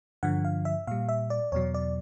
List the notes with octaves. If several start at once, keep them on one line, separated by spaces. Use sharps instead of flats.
G2 D3 F3 F#5
F5
E5
A#2 G3 F5
E5
D5
E2 B2 F#3 C#5
D5